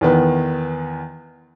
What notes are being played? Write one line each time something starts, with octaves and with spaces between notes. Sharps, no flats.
E2 D#3 B3